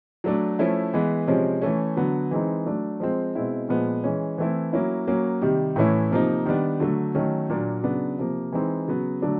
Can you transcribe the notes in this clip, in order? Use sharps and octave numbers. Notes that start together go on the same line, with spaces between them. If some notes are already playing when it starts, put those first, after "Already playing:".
F#3 A3 D4
F3 A3 C#4 E4
E3 G#3 B3
C3 F3 G#3 C#4
E3 A3 C#4
D3 F#3 B3
E3 G#3 C4 D#4
F#3 A3 D4
F3 G#3 C4
B2 G#3 C4 E4
A#2 F3 G#3 B3
E3 G#3 C#4
E3 A3 C4 E4
F#3 A#3 C#4 E4
F#3 A#3 C#4
C3 D#3 G3
A2 E3 A3 C#4 E4
C3 F3 A#3 D#4
D#3 G3 B3 D4
D3 F#3 A3
D#3 F#3 A3 C#4
A#2 F#3 A#3 D4
C#3 F#3 B3 D4
C3 F3 A#3
E3 G#3 C4 D#4
C#3 F#3 B3
D3 F#3 A3 D4